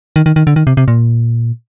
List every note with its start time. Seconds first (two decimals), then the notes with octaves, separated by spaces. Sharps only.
0.16 D#3
0.26 D#3
0.36 D#3
0.47 D3
0.56 D#3
0.67 C3
0.77 C3
0.88 A#2